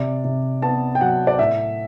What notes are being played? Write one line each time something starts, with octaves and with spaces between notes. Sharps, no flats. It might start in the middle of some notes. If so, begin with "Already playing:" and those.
Already playing: C3 D5
C3
B3 A5
G5
F#3 F#5
D5
A2 E5